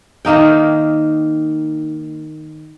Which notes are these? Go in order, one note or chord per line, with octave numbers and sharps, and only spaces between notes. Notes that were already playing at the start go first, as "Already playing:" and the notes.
D#3 A#3 D#4 G5